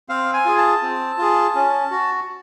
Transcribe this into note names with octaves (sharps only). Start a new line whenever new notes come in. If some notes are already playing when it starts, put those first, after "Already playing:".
C4 F5
G#5
F4 G#4
A5
C4
F4 G#4
C#4
F#4